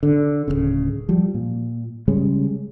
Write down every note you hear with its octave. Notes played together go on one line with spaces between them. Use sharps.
D3
D1 G1 C#3
F3 G3
A#2
C#3 G3 G#3 C#4